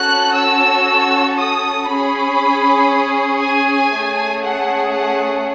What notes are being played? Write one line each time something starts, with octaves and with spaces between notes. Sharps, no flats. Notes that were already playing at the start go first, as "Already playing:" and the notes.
Already playing: C#4 F#4 A4 F#6
E6
D#6
C#4 G#4 B5
G#5
A3 C#4 G#4
F#5
F#5